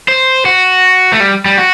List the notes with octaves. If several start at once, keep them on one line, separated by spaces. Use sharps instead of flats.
C5
F#4
A3
G3
G3
F#4